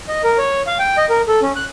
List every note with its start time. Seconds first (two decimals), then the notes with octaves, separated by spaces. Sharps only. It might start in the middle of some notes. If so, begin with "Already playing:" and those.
0.08 D#5
0.24 A#4
0.38 C#5
0.67 F5
0.79 G5
0.97 D#5
1.10 A#4
1.28 A4
1.42 C#4
1.56 F#6